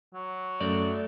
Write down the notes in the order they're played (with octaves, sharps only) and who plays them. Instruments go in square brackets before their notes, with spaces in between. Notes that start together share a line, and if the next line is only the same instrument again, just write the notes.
[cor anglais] F#3
[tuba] F#2 [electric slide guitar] A3 D5